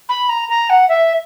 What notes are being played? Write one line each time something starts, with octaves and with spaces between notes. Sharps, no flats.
B5
A#5
A#5
F#5
E5